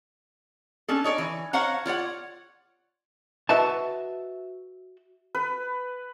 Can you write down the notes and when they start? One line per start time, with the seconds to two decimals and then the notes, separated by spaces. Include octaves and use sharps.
0.88 C#4 D4 A4
1.04 D#4 C#5 D5
1.18 E3
1.53 C5 C#5 F5 F#5 A#5
1.86 F4 C#5 D5 F#5
3.49 F#4 B4 D#5 E5 F#5 A5
5.35 B4